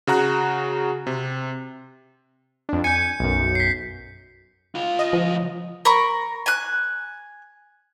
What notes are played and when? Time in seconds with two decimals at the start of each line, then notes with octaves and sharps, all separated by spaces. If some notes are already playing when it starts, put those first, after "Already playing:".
0.07 C#3 F#4 A#5 F#6
1.07 C3
2.69 F2 D4
2.84 G#5 G6 C#7
3.20 B1 F#2
3.55 B6 C7
4.75 C#2 F4
4.99 D#5
5.13 F3
5.85 A#4 B5 C#6
6.46 G#5 F#6